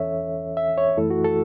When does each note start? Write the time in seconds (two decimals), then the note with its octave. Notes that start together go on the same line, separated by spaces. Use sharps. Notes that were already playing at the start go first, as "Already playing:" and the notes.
Already playing: E2 E3 C#4 A4 C#5 E5
0.57 E5
0.78 C#5
0.97 F#2 E3 A3 E4 A4
1.10 F#4
1.24 A4